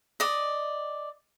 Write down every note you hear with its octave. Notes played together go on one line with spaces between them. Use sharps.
D5 D#5